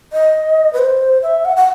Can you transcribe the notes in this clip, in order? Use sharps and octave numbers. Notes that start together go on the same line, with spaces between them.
D#5
B4
C5
E5
F#5
F#5